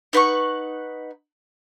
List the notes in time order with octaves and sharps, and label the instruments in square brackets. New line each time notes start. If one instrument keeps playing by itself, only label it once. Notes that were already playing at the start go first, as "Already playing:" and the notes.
[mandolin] D#4 B4 F#5 C#6